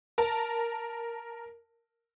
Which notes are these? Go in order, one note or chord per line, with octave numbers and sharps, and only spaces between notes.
A#4 A5